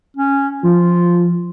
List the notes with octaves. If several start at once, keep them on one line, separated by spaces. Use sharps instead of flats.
C#4
F3 F4